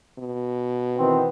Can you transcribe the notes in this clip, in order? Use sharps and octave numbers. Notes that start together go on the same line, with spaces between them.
B2
D#3 E3 B3 C4